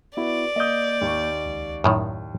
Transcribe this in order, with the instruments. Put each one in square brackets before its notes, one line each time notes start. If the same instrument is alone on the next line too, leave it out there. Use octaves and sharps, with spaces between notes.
[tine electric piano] B3 E4 [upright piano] F#4 B4 [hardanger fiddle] D5
[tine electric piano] A#3 G6 [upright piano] D#5 D#6
[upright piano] D#2 C#6
[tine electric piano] C#2
[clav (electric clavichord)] F#2 A2 D#3